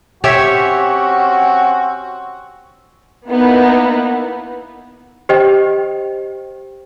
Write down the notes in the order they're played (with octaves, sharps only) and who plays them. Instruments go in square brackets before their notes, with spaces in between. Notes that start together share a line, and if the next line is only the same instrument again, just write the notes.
[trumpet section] C4 C#4 F#4 [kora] G4 C#5 E5
[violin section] A#3 B3 D#4 E4
[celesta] G4 C5 D#5 G5